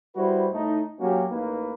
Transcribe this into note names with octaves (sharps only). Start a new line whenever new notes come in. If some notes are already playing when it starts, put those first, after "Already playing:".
G3 E4 F#4 B4 C5
A2 A3 D#4
F#3 A#3 C#4 F#4 G4
A1 A#3 D#4 B4